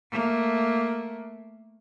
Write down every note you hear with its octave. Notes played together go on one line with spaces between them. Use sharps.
A3 A#3